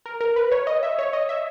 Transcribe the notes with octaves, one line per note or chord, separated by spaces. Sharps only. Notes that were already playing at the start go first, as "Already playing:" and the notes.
A#4
A#4
B4
C#5
D#5
E5
C#5
D#5
E5